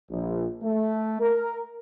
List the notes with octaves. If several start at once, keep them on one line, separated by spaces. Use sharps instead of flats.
A#1
A3
A#4